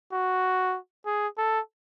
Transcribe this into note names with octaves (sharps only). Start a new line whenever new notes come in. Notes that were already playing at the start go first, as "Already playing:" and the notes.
F#4
G#4
A4